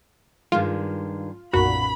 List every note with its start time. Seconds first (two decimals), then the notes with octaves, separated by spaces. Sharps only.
0.52 G2 D#3 G#3 F4
1.53 B1 F#2 A#2 F#4 F5 B5